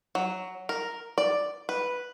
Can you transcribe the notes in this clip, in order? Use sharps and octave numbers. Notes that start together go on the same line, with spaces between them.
F#3
A#4
D5
B4